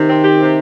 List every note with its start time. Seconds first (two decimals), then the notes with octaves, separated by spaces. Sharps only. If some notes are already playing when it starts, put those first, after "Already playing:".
Already playing: C3 D#3
0.08 C4
0.23 G4
0.39 C3